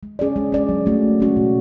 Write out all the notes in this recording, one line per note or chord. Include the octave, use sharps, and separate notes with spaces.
G#3
C#4 G#4 D5
G#3
C#4 G#4 D5
F#3
A3 C#4 F#4
F#3
A3 C#4 F#4
B2